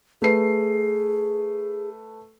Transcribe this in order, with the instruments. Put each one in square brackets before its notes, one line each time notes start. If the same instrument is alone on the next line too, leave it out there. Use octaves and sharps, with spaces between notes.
[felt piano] A3 B4 C7 [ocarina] G#4